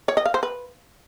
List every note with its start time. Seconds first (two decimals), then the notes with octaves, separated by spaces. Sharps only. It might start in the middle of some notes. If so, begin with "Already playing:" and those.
0.08 C#5
0.17 D#5
0.25 F5
0.34 C5
0.43 B4